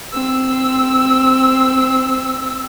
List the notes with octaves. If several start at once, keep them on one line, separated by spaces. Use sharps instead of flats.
C4 E6